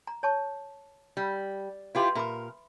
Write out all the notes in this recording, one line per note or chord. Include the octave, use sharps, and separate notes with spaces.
A#5
C#5 A5 C#6
G3
E4 F4 G4 B4 C6
A#2 A#4 E5 B5 D6